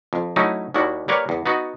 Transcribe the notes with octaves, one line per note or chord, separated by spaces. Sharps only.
F2
F#3 A3 C#4 D#4 E4
D#2 D#3 G3 E4 F#4
G3 A#3 A#4 B4 C#5
E2
B3 D#4 F#4